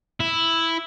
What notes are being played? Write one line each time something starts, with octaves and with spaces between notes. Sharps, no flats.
E4